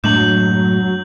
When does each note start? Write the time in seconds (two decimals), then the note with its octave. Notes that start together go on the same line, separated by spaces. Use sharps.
0.04 F#2 A2 F#3 G#3 A3 D4 G6 F#7